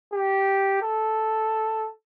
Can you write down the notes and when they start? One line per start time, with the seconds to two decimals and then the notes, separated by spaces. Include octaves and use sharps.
0.13 G4
0.82 A4